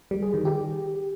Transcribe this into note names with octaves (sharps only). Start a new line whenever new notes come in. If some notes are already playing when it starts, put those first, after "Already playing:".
G3
G#4
D#3
G4